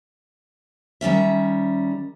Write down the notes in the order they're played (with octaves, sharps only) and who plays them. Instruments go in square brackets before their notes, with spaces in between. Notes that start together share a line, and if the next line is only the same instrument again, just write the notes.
[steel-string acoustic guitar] D#3 G3 C#4 E5